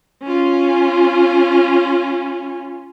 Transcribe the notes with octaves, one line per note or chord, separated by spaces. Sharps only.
C#4 F4